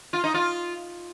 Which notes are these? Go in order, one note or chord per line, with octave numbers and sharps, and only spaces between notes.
F4
D#4
F4